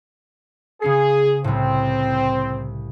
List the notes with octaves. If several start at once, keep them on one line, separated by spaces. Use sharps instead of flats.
C#3 C#4 G#4 C7
C2 A2 C4